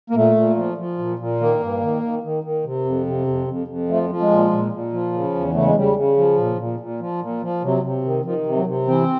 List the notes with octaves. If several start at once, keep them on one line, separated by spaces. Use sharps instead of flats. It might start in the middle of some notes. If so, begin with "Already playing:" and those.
A#3
A#2 A3
A#2
F3
F3
A#2
A#2
D#3 A#3
G2
D#3
D#3
D#3
D#3
C3
F2
C3
F2
F2
F2
F3 A3
F3
G#3
A#2
A#2
A#2
F3
C#3
E2
C#3 A3
G#3
C#3 G3
C#3
F3
A#2
A#2
A#2
F3
A#2
F3
C3 F#3
C3
D#3
D#3 F3
C3
F#3
C3
E3 C4